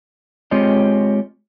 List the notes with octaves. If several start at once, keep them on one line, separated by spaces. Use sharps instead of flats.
G#3 C4 F4 G4 C#5 D#5